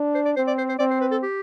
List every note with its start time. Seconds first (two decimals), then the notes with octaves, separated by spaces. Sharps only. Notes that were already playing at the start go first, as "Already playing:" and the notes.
Already playing: D4
0.15 C5
0.26 D5
0.36 C4 C5
0.47 D5
0.58 C5
0.69 C5
0.79 C4 D5
0.91 C5
1.01 B4
1.11 A4
1.23 G4